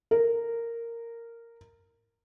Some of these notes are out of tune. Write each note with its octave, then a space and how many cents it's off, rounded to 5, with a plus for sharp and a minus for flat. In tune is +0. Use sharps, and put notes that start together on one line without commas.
A#4 -10